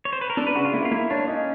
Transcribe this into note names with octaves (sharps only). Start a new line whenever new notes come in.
C#5
C5
B4
A#4
D4 A4
B4
C#3 F#4
F4
A#3 E4
F4
A#3 E4
D4 C#5
C#4 D#4